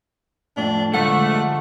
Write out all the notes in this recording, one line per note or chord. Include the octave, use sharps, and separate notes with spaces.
F2 A2 D4
G#2 D3 A3 F4 F#5
G4 E5